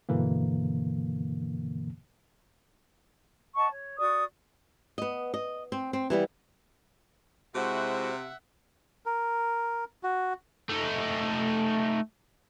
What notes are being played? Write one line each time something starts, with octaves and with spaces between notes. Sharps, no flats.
G2 B2 D3 E3 A#3
D#5 F#5 A5 C#6
C#5
F#4 D5 C#6 D#6
B3 D#5
D#5
C4
C4
E3 G3 B3
C3 G#3 E4 F#4 C5 E5 F#5
A#4
F#4
A3 D#4